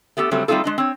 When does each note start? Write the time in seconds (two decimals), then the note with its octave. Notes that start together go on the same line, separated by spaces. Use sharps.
0.17 A3 B3 G4 A4
0.31 C#3 F#3 G3 A3 C4
0.48 G3 A3 C4 D#4 F4 A4
0.64 G#3 D4 D#5
0.78 C4 C#5